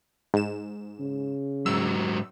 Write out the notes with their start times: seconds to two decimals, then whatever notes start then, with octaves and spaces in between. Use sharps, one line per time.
0.34 G#2 E7
1.00 C#3
1.66 G#2 F#3 E6